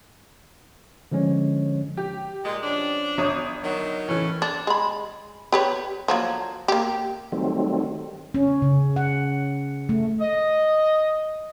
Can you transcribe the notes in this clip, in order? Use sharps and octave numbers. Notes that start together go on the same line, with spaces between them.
D3 F3 G#3 C#4 C#5
G4
A#2 G3 G#3
F3 C#4 D4
G1 C#5 D#6
D#3 F#3
A2 E3 C#4
D4
G#3 B5
G4 B4 C#5
F3 F#3 A#3
A#3 G4
D#3 F#3 G3 A3 C4
C#4
C#3
F#5
A3
D#5